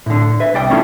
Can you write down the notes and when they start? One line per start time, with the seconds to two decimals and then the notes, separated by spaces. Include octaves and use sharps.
0.06 A2 D3
0.40 B4 E5
0.54 C2 D5 G5
0.70 A3 C#4 D4 E4 F4 A4